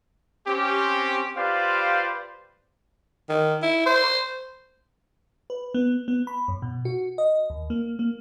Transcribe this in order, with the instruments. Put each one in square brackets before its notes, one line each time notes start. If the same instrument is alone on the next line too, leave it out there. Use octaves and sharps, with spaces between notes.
[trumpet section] C4 C#4 G4
F4 G4 B4 C5 D5 F5
[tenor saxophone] D#3
E4
C5
[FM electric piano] B4
B3
B3
B5
F#2
B2
F#4
D#5
D#2
A#3
A#3